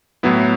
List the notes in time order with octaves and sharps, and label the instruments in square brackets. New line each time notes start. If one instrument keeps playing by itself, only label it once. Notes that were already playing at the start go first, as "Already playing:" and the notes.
[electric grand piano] A2 F#3 B3 E4